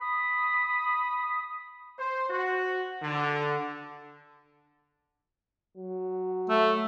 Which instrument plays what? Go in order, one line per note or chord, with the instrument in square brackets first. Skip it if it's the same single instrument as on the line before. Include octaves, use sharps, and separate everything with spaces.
[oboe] B5 [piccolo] D#6
[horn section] C5
F#4
D3
[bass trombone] F#3
[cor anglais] A3